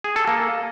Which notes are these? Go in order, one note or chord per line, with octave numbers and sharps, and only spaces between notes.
G#4
A4
A#3